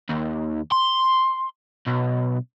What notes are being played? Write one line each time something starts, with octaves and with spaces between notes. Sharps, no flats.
D#2
C6
B1